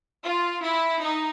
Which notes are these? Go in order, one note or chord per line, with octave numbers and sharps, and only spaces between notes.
F4
E4
D#4